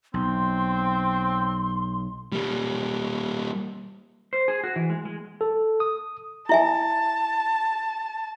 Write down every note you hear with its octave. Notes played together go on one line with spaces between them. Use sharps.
B1 C4 C6
G3 A#3
C5
G#4
F#4
E3
G#3
G#3
A4
D#6
E4 E5 G#5 A5